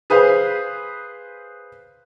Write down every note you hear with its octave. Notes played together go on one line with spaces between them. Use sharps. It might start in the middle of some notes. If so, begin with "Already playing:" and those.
G#4 B4 C5 F5